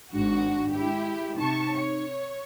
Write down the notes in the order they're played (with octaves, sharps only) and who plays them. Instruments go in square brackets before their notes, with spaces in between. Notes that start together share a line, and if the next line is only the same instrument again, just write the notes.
[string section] G#1 G#2 F#4 [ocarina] D4
[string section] G#3 E4 G4
[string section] C3 A5 C#6 [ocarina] D#4
[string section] C#5